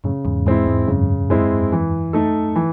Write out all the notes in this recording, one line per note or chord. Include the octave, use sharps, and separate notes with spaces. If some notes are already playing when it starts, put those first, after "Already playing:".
F#2 A2 C#3
E2 G#2
E2 G#2 G#3 C4 E4
E2 G#2
F#2 C#3
G#3 C4 E4
E3
A3 D#4 A4
E3